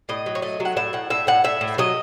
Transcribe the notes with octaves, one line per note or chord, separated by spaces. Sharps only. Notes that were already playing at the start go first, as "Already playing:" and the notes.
A2 D#5
F#3
C#5
A3 D#5
F#3
F#5
A2 E5
A2 F#5
A2 E5
A2 F#5
A2 E5
A2
F#3 D#5